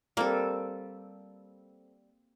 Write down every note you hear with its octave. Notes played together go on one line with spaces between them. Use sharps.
G3 A#3 C4 A4